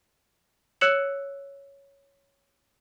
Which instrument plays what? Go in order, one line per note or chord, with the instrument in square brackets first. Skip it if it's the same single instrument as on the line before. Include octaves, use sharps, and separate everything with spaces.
[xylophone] C#5 E6 F#6 C#7 E7 F#7